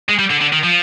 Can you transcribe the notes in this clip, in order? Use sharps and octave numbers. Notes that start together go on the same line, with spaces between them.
G#3
G3
D3
D3
D#3
F3